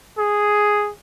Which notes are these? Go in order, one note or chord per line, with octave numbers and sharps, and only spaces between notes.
G#4